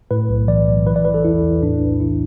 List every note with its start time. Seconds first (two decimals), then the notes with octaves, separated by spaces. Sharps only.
0.11 A2 B4
0.29 B1
0.48 E3 D5
0.68 B1
0.86 E3 B4
0.96 D5
1.05 E3 B4
1.14 A4
1.25 E2 E4
1.43 E2
1.62 A2 D4
1.81 B1
2.00 E3 E4